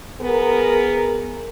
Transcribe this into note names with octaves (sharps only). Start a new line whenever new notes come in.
B3 G#4 A#4